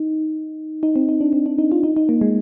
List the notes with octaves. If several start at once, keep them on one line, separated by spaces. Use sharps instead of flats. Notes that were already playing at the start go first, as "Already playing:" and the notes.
Already playing: D#4
D#4
C4
D#4
D4
C4
D4
D#4
F4
D#4
D#4
A#3
G#3